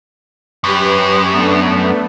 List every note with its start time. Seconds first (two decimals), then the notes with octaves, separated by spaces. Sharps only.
0.64 F#2 G4 B4
1.32 A3 B3 D4